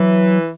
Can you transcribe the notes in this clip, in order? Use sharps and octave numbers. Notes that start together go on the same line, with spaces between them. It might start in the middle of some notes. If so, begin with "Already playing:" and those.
Already playing: E3 F#3